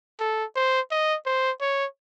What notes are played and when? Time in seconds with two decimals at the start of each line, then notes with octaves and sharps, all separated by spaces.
0.20 A4
0.56 C5
0.91 D#5
1.26 C5
1.61 C#5